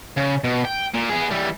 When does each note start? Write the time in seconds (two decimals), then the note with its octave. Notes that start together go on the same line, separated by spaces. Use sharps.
0.17 C#3
0.44 B2
0.65 G5
0.94 A#2
1.09 B3 G#4
1.31 E3 G3